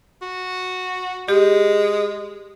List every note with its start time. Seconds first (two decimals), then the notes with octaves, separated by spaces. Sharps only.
0.22 F#4
1.29 G#3 G4